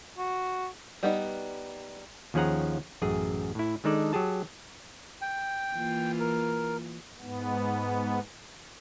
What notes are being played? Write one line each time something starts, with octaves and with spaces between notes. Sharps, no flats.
F#4
G3 B3 D#4
D#2 F3 C#4 G#4 F#5 A#5
A1 F#2 G#4
A2 E4
D#3 G#3 D4 D#4 A4 D5
F#3 G4 G#4 A5
G5
E3 A#3 F4
A#4
G#2 B3